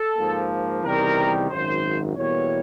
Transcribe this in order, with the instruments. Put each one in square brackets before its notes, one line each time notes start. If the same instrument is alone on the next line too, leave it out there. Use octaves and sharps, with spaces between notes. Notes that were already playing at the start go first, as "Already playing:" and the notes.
Already playing: [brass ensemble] A4
G#2 F3 A#3
E2 C3 D#3 G3 A#4
G#1 F#2 D#3 C5
E2 B2 G3 A#3 C#5